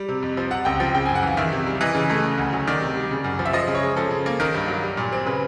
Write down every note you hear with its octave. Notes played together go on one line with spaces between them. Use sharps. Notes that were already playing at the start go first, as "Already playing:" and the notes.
Already playing: G3
C3
F2
F3
C3 F#5
C#2 G5
F3 G5
C#3 G5
F#2 G#5
F#5
E3 F5
D#3 E5
C3
G3
E3 D#5
C#3
A3
C#3
D2
F#3
D#3 D5
C3
G3
C#3
F#2
F3
E5
F3 D#5
C#3
C#5
G#3
F3 A4
C#3
A#3
D#3 A#4
G2
F#3
G3
A#2
C4
C#3 B4